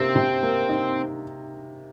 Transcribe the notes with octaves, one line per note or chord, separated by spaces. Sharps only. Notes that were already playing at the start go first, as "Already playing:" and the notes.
Already playing: C3 A#3 C4
C3
A#3
D#4